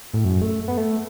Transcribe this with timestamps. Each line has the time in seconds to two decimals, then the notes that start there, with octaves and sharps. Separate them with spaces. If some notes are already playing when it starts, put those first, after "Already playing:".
0.14 A2
0.24 F#2
0.42 A3
0.68 B3
0.77 A3